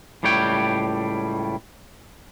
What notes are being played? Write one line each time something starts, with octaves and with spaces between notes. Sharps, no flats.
C#2 A2 G3 C#5 G5